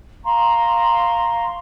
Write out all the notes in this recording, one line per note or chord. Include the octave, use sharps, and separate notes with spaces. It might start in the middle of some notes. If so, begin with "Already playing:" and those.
F5 A#5 C6 C#6